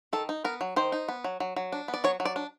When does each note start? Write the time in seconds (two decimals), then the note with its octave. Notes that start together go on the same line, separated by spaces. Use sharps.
0.13 D#3 A4
0.29 D#4
0.44 B3 A#4
0.61 F#3
0.76 D#3 C5
0.92 D#4
1.08 B3
1.24 F#3
1.40 F#3
1.56 F#3
1.72 D4
1.88 B3
1.94 D5
2.04 F#3 C#5
2.20 F#3
2.25 D5
2.36 D4